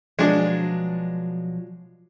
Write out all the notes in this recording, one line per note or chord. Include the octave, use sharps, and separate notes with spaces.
B2 F3 F#3 G#3 D4